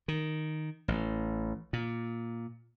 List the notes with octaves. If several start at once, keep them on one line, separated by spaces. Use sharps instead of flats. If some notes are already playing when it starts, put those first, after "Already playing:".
D#3
A1
A#2